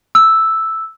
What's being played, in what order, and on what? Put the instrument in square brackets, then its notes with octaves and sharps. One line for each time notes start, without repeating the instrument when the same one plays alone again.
[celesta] E6